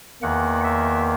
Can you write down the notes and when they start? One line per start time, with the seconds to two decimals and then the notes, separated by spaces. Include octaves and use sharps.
0.22 E2 D#3 A#3 F#5
0.64 E5